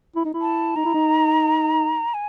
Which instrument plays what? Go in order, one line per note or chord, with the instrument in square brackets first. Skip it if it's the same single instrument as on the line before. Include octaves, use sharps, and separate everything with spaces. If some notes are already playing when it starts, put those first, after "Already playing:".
[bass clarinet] E4
D#4
E4
[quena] A5
[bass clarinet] D#4 [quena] A#5
[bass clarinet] E4
D#4
[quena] G#5